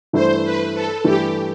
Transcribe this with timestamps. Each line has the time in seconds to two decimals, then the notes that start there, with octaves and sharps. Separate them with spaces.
0.13 G2 E3 A3 E4 C5
0.44 B4
0.74 A4
1.04 G2 E3 A3 E4 G4